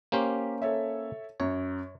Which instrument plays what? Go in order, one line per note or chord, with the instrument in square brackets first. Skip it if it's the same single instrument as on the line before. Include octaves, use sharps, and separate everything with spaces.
[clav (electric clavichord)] A#3 C#4 C5 [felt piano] G4
[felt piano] A4 C#5 E5
[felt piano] F#2 [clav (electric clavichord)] C#5